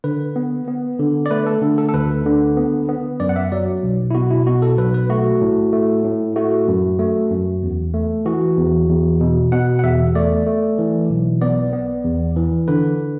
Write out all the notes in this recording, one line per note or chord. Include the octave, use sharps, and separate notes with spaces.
D3 B4
B3
B3
D3
D5
A3 B4
A4
D3
A4
A4
D2 B4
D3
B3
B3
F#2 D5
F#5
E5
F#3 D5
B1
E4
B2 F#4
E4
B2 F#4
A4
B1 B4
B4
A3 F#4
A2
A3
A2
A3 F#4
F#2
A3
F#2
E2
A3
E3 F#4
E2
E2
B2
B2 F#5
F#5
E2 E5
A3 D5
A3
E3
B1
B3 D5
B3
E2
E3
D3 B4